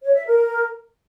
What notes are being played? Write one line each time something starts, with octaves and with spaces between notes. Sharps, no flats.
C#5
E5
A#4